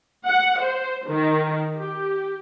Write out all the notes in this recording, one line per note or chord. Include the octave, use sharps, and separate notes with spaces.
F#5
C5
D#3
G4